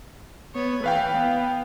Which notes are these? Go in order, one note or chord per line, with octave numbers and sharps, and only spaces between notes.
B3 C#5
E3 B4 F5 G5
B3